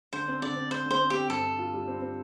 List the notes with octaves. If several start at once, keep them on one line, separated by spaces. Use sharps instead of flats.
D3 C5
C4
D3 D5
C4
C4 C5
D3 C5
C4
C4 G4
G2 A4
G2
F4
G3
C4
C4